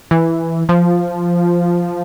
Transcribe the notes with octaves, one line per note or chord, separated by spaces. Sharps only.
E3
F3